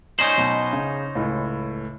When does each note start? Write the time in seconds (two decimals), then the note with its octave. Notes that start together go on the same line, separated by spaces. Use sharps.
0.19 C#4 D#4 C5 F#7
0.38 B2 F#3
0.73 C#3
1.15 C#2 A2